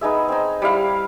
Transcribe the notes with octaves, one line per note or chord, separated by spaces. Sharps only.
B3 D#4 G#4 E5
C4 D#4
G3 E4 F5